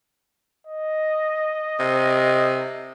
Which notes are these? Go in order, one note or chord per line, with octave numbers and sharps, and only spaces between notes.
D#5
C3